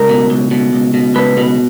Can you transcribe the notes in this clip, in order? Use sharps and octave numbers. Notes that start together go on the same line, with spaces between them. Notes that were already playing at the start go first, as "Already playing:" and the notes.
Already playing: C#2 A#4
B2
C#2
B2
C#2
B2
C#2 B4
B2